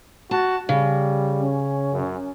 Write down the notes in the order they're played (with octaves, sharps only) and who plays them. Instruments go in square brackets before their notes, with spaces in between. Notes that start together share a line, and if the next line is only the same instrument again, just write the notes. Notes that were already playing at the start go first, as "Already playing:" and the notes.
[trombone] F#4 [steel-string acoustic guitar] A5
[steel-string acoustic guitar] C#3 [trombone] G3
[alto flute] C#4
[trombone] F#2